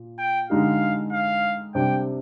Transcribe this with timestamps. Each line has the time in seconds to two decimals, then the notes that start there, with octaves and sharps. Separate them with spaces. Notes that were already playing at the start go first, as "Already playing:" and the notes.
Already playing: A#2
0.19 G5
0.50 D3 G#3 D#4 G4 F5
1.13 F5
1.75 C3 G3 D4 G5